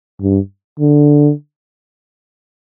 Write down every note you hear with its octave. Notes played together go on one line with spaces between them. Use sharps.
G2
D3